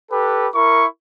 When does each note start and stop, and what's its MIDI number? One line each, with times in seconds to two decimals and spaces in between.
0.11 0.48 67
0.11 0.48 69
0.11 0.48 71
0.55 0.86 64
0.55 0.86 70
0.55 0.86 85